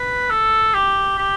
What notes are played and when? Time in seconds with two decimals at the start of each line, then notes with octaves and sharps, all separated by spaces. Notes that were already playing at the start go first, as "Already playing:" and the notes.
Already playing: B4
0.30 A4
0.74 G4
1.18 G4